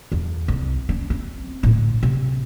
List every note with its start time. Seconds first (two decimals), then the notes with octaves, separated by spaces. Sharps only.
0.12 E2
0.48 C2
0.89 C#4
1.10 C4
1.63 D2 A2
2.03 C3